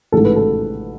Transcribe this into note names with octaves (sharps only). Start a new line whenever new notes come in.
A1 G#2 E3 A4
B4
A4